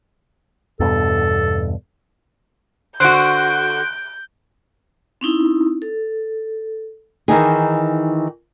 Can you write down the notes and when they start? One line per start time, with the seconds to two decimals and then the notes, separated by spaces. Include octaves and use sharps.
0.80 E2 G2 B2 A4
3.00 D3 F#4 C5 F#6 G6 D7
5.21 C4 C#4 D#4 E4
5.82 A4
7.28 D#3 E3 D#4 G#4